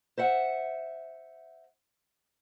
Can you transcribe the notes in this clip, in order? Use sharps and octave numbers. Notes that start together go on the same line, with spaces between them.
C5 E5 F#5